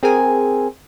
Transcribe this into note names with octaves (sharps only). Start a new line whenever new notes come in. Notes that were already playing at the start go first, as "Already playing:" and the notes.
C4 G#4 A#4 G#5